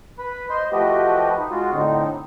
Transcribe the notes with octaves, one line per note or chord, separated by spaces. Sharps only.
B4 B5
C5 D#5 C6
F3 A3 F#4 G4 B4 D#5
D#4
G#3 F4 F#4
A2 D3 C4 D#4